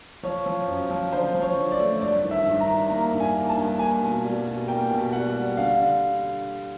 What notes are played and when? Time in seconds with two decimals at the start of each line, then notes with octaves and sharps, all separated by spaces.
0.23 F3 C#5
0.46 F3
0.68 F#2
0.90 F3
1.13 D3 C5
1.35 F3
1.42 C#5
1.57 D3
1.72 D5
1.79 A3
2.02 G2 D5
2.24 D#3
2.31 E5
2.46 G2
2.60 A#5
2.68 D#3
2.90 A#3 A#5
3.13 G2
3.20 G#5
3.35 A#3
3.49 A5
3.57 G2
3.79 A#3 G#5
4.01 B2
4.24 G3
4.46 B2
4.68 A#3 G5
4.90 B2
5.13 G3 F#5
5.35 G3
5.57 D3 F5
5.79 D3